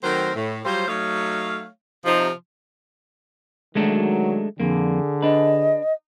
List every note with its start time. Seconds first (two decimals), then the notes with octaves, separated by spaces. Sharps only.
0.03 D#3 F#3 A3 C4 A#4 C5
0.36 A2
0.65 F#3 G3 F4 C5
0.88 F#3 A3 D#4 C#5 F5
2.05 C3 F3 D#4
3.75 D#3 F#3 G#3 A3 D4
4.60 F2 D3 A#3 G#4
5.22 D4 B4 D#5